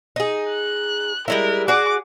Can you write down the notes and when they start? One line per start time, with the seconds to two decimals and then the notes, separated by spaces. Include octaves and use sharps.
0.16 D#4 G#4
0.50 F#6
1.28 G3 G#3 E4 A#4
1.68 F#4 G#4 D5 D6